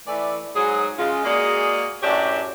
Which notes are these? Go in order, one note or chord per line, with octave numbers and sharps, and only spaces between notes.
E3 A3 D5
G#2 F#3 G#4
C#3 G#3 F4
G#3 A#3 F#4 G#4 D5
F#2 A2 D4 F#4 G4 C#5